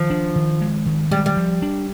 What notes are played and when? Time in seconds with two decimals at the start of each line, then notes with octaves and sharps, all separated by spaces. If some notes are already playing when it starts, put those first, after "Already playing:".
Already playing: D#3 F3
0.10 D4
0.36 D#3
0.61 G#3
0.86 D#3
1.11 G3 G#3
1.26 G3
1.37 F3
1.62 D4